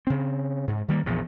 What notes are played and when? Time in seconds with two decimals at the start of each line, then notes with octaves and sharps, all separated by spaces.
0.07 C#3 C4
0.67 G#2
0.88 D#3 G3 A#3
1.06 A#1 E2 A#2 F3